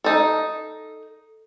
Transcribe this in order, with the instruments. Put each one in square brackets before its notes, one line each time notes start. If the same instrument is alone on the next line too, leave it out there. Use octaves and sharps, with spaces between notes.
[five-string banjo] D#4 A4